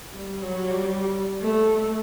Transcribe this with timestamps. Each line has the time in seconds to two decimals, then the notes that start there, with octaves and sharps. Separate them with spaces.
0.14 G3
0.42 F#3
0.71 G3
1.42 A3